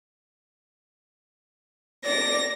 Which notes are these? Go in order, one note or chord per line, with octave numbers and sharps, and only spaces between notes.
D5 A#6